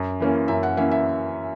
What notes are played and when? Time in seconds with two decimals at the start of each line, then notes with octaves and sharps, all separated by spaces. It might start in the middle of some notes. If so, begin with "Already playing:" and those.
Already playing: F#2
0.20 E3 A#3 C#4
0.48 F#2 E5
0.63 F#5
0.77 E3 A#3 C#4 E5
0.91 E5